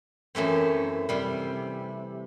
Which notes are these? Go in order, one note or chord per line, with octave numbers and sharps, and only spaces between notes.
F#2 E3 A3 C4
C3 G3